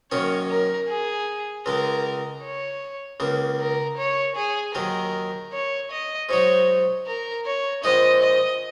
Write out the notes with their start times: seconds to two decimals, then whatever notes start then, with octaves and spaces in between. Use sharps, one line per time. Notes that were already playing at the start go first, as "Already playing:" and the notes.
0.11 F#2 D#3 A#3 C#4 C#5
0.49 A#4
0.88 G#4
1.66 C#2 C#3 G#3 A#4
2.43 C#5
3.20 C#2 C#3 A#3
3.60 A#4
3.98 C#5
4.36 G#4
4.75 D#2 D#3 F#3 A#4
5.53 C#5
5.91 D#5
6.29 G#2 F#3 D#4 C#5
7.07 A#4
7.46 C#5
7.84 A#1 G#2 G#3 D#4 D#5
8.22 D#5